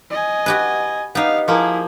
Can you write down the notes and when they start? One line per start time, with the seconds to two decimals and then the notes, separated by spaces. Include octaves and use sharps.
0.10 D#5 G#5
0.46 F#4 G4 B4
1.15 B3 D#4 G4 F5
1.48 F3 A#3 E4 G#4